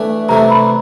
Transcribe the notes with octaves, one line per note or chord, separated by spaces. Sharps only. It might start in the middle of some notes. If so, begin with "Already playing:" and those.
Already playing: E3 A3 D4
C3 E3 A3 D4 A#5
B5